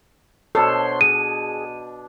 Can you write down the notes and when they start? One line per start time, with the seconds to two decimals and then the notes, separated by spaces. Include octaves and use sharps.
0.55 B2 D4 A4 C5 C#5 B5 C6
1.01 G#4 D#7